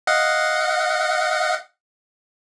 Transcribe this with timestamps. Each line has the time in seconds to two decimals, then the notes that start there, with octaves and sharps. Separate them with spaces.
0.07 D#5 F5 F#5